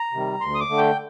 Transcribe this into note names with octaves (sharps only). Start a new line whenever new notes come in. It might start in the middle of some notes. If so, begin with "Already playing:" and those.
Already playing: A#5
C3 D#3 G3
D2 C6
D#6
D6
D3 A3
G5